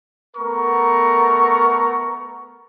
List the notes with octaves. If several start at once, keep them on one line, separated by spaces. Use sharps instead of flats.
A3 B3 A#4 A#5 C#6